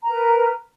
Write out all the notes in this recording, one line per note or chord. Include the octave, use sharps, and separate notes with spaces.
A#4 B4 A#5